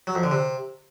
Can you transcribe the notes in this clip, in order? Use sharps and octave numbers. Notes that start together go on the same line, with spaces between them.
F#3
F2
D3
C3